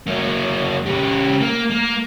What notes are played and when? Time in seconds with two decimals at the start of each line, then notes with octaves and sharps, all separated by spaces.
0.07 F#3 A#3
0.86 C#3 G4
1.41 A#3
1.71 A#3